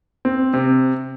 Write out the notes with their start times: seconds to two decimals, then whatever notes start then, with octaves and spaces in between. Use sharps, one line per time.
0.25 C4
0.54 C3